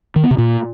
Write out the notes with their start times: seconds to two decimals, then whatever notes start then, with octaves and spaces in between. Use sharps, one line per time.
0.16 D#3
0.23 B3
0.31 C3
0.38 A#2